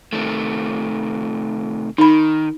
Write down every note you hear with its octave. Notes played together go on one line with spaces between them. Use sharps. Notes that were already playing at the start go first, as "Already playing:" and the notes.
C3 D#3 A3
D#3 D#4 B5